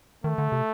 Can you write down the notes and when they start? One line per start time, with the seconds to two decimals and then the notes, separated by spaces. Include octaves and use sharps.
0.24 D#3 A3
0.38 D3
0.52 C3